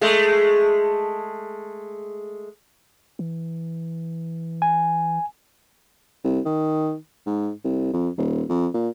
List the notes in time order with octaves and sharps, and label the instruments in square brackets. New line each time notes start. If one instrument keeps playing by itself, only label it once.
[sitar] G#3 A3
[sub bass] E3
[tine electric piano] G#5
[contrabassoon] C2
D#3
G#2
C2
F2
D#1
F2
A#2